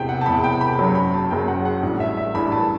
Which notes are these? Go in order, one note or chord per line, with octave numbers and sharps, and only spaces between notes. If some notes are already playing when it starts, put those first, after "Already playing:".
Already playing: E1 E2 C3 G5
F#5
A5
E1 E2 C3 B5
G5
B5
F#1 F#2 F#3 B5
B5
A5
F#1 F#2 F#3 G5
F#5
F#5
A1 G2 E3 F#5
E5
E5
A1 G2 E3 B5
A5